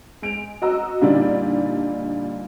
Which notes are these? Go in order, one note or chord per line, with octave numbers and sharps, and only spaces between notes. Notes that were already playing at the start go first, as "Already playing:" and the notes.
G#3 D7 F7
F#4 D#5 A#5 E6
A#2 D3 G3 D4 D#4 D5